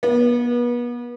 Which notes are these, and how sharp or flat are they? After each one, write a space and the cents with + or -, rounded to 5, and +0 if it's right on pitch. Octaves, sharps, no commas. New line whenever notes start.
B3 -35